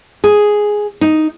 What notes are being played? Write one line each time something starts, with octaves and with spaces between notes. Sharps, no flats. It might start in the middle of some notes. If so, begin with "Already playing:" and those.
G#4
D#4